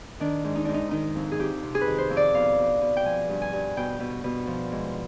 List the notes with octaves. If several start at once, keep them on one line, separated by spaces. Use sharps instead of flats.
D#3 D4
G#2
D#4
G#2 D4
D#4
D#3 D#4
F2
G#4
F2 G4
C3
G#4
B4
D#3
C5
F2
D5
B2 F5
B2
B2
G5
F3 G#5
G2
G#5
G2
B2 G5
B2
B2
F3
G#2